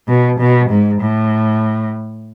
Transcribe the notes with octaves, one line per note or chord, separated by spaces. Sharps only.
B2
B2
G#2
A2